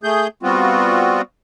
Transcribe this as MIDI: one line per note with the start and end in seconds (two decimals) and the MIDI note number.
0.03 0.27 57
0.03 0.27 68
0.03 0.27 91
0.43 1.22 55
0.43 1.22 59
0.43 1.22 60
0.43 1.22 65
0.43 1.22 66